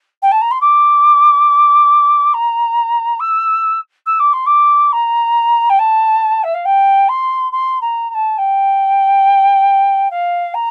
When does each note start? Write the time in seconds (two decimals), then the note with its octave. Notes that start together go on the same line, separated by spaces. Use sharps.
0.22 G5
0.32 A5
0.41 A#5
0.51 C6
0.61 D6
2.34 A#5
3.20 E6
4.06 E6
4.20 D6
4.33 C6
4.46 D6
4.93 A#5
5.70 G5
5.79 A5
6.44 E5
6.54 F5
6.65 G5
7.09 C6
7.52 C6
7.81 A#5
8.10 A#5
8.15 A5
8.38 G5
10.11 F5
10.54 A#5